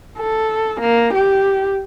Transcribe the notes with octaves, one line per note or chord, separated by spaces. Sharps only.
A4
A#3
G4